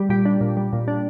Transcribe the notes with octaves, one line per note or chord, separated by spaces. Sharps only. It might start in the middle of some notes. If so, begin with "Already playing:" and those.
Already playing: G3
A#2 G4
D4
A#2
G3
A#2
D4